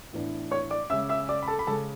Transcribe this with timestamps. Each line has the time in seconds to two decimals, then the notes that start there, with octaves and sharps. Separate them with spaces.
0.13 A2 E3 B3 D4
0.51 C#5 C#6
0.71 D5 D6
0.90 C#3 G#3 C#4 E5 E6
1.09 E5 E6
1.29 D5 D6
1.43 B5
1.48 A4 A5
1.59 B5
1.67 C#3 G#3 C#4 A4 A5